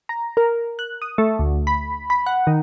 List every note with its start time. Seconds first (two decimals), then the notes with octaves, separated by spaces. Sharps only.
0.09 A#5
0.37 A#4
0.79 F#6
1.02 D#6
1.18 A3
1.39 D2
1.67 B5
2.10 B5
2.26 F#5
2.47 D#3